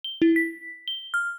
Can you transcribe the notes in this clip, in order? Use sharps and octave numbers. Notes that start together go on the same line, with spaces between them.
G7
E4
B6
G7
F6